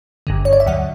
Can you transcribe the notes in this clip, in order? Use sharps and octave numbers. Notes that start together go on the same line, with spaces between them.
G1 G2 D3
C#5
D5
E5
D2 D3 F#3 F#5